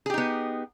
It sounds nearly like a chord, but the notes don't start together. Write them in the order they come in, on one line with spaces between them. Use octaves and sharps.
G#4 G4 D#4 B3